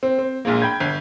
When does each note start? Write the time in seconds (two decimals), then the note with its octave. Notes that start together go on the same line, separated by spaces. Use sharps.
0.03 C4
0.19 C4
0.45 A#1 A#2 G#3 A#3
0.62 G5 B5 G6 G#6
0.80 G1